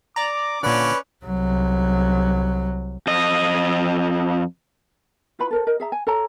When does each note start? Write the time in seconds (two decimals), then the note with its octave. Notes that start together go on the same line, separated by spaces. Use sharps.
0.16 D5 A#5 D6
0.63 A#2 D3 C#4 B4 D5 C#6
1.25 C2 F#3
3.07 F2 D#5
5.39 E4 F4 B4 B5
5.51 A4 A#4 C5
5.67 A#4 D#5
5.80 G#4 E5 A#5
5.92 G#5
6.07 A4 C#5 A#5